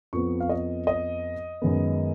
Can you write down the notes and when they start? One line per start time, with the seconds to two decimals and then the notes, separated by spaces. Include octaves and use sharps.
0.13 F2 F3 B3 C#6
0.40 F5
0.49 D#5
0.87 D#5
1.62 F#2 D#3 G#3 B3